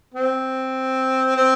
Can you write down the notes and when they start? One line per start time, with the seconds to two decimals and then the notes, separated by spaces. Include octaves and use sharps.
0.14 C4
1.36 C4